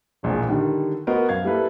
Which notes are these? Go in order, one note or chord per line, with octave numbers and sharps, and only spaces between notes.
E1 A#1 A#2 F3 G#3
D3 D#3 G3
B3 F#4 A#4 C5 D#5
F#2 F5 G#6
G3 A#3 E4 A4 B4